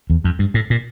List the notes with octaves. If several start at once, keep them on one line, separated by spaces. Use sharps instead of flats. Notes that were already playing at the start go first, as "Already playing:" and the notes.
E2
F2
G2
A2
A#2